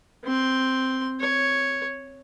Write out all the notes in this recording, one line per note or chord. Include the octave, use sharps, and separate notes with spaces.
C4 C6
C#5